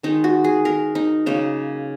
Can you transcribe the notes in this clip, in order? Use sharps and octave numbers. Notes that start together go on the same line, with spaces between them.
D#3 G#3 D#4
F#4
G#4
A#4
D#4
C#3 F#3 A#3 D#4